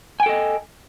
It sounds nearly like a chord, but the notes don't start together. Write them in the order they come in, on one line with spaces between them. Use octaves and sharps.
G#5 G5 A4 D#5